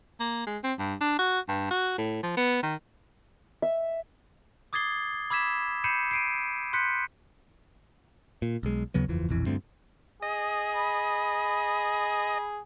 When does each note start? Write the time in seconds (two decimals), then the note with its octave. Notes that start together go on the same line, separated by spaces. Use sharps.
0.20 A#3
0.47 G#3
0.64 C4
0.79 G2
1.01 D4
1.19 F#4
1.49 G2
1.71 F#4
1.98 A2
2.23 F3
2.37 B3
2.63 D#3
3.62 E5
4.73 D6 D#6 G#6 A6 C7 G7
5.30 B5 D6 E6 G#6 B6 E7
5.84 B5 G6 C7 C#7 D#7 E7
6.11 C7 D7 D#7
6.73 C6 F#6 G6 B6 C#7
8.42 A#2
8.63 B1 G#3
8.94 D#2 C#3 F#3 B3
9.09 F#1 E2 E3 F3
9.29 E1 A#1 F2 E3
9.46 D2 G2 A3 C4
10.22 G#4 D#5
10.74 B5